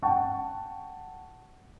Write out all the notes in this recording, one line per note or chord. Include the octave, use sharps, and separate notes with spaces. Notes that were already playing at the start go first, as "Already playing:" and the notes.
F#5 G5 A5 C#6